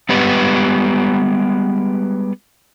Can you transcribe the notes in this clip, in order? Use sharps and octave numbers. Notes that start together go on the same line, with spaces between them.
G3 G#3 B3 G4 B4 D#5